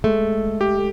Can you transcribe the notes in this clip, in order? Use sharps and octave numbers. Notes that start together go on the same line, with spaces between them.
G#3 A3
G4